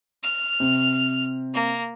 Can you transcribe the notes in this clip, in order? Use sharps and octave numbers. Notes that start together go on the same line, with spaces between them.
F6
C3
A#3